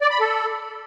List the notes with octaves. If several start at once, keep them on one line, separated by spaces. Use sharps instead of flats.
D5
B5
A4